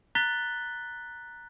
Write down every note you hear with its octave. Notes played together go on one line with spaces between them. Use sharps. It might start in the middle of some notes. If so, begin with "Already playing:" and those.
A#5 F#6 A6 B6 G7